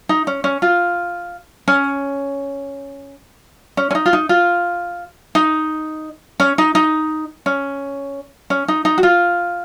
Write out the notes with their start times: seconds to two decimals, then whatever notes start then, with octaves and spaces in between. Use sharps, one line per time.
0.09 D#4
0.27 C#4
0.44 C#4
0.62 F4
1.68 C#4
3.77 C#4
3.91 C#4
3.95 D#4
4.06 F4
4.13 D#4
4.29 F4
5.35 D#4
6.40 C#4
6.58 D#4
6.75 D#4
7.46 C#4
8.50 C#4
8.68 D#4
8.85 D#4
8.98 F#4
9.03 F4